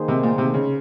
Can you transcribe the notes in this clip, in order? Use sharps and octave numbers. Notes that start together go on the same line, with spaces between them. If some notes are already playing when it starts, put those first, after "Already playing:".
Already playing: D#3 A#3 D#4 G#4 C5
C3
A#2
C3
C#3